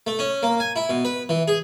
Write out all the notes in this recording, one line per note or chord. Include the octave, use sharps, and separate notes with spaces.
A3
C#4
A#3
G#5
E4
B2
B4
E3
G#4